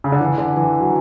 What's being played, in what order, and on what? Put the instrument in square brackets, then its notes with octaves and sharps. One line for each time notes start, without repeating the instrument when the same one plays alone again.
[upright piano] C#3
D3
E3
D3
E3
F#3